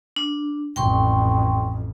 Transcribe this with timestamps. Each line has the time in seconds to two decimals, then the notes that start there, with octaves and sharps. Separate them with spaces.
0.16 D4
0.76 A1 F2 G5 C6 C#6